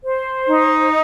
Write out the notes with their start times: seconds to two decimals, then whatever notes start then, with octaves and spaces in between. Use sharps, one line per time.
0.05 C5
0.48 D#4